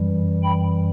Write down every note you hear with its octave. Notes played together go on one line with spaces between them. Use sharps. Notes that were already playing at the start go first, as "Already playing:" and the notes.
Already playing: F#2 E3 G3
G5 B5